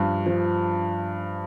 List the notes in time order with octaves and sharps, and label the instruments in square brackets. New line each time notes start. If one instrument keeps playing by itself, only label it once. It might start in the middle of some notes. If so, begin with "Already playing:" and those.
Already playing: [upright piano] G2 F3
F3